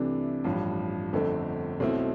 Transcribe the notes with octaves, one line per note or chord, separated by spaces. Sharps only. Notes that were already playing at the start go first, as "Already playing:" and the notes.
Already playing: C2 C3 E3 A3 D4
A1 G2 F3
G1 F2 D3 A3 C4
B1 B2 A3 C4 E4